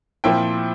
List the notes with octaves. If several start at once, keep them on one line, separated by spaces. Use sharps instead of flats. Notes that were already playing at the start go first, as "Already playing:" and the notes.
A#2 F3 C4 E4 G5